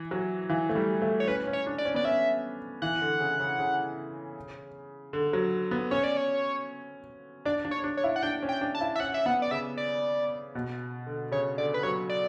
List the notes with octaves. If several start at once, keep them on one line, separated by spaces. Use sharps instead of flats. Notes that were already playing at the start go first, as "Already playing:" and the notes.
Already playing: E3
F#3
E3
A3
G3
A3
C#5
C#4 B4
C#4
C#5
D4
D5
C#4
B3 D5
C#4 E5
E3 F#5
D3
C#3
C#3
C#3
D3
F#3
B3
C#4 C#5
D5
C#5
D4 D5
D4
C#5
D4
C#5
E4
F#5
D4 G5
C#4
G5
D4
A5
E4
E5
C#4 F#5
E5
B3 F#5
D5
C#3 E5
D5
B2
D3
C#3 C#5
D3 D5
B4
F#3 C#5
D5